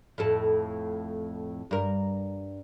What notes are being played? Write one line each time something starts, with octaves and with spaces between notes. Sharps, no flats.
F2 A2 A4
G2 A#4